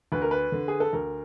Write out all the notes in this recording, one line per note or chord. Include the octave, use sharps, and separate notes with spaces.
D2 B4
A#4
B4
D3
G#4
A4
D2 A#4